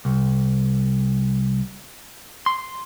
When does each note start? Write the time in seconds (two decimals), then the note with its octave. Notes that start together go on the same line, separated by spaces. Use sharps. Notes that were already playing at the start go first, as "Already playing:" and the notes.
0.05 C2
2.46 C6